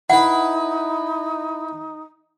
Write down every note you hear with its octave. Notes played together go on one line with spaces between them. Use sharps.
D#4 E4 B4 F#5